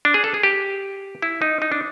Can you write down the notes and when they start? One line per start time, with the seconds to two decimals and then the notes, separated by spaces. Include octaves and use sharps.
0.05 D4
0.14 G#4
0.24 A4
0.34 G#4
0.43 G4
1.22 E4
1.42 D#4
1.62 D#4
1.72 D4